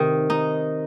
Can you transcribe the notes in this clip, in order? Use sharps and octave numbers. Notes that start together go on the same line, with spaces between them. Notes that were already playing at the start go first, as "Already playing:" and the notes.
Already playing: C3 D#3
D#4